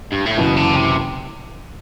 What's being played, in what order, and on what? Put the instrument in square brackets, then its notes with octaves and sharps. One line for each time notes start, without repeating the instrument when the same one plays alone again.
[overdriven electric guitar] G2
A2
[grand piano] F#1 F#2 E3 [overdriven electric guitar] B2
[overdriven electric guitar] D3
C3